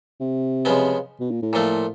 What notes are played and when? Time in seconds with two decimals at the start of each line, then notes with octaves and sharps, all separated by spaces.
0.20 C3
0.65 C#3 F3 G#3 B3
1.20 B2
1.31 A#2
1.42 A2
1.53 A#2 F3 A3